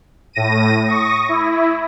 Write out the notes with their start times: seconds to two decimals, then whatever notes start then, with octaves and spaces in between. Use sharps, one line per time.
0.33 A2 A#6 D#7
0.88 C#6 D#6 A#6
1.29 E4